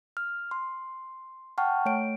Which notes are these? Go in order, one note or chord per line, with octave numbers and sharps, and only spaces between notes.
F6
C6
F#5 G5 A5 C#6 F6
A3 C#5 D7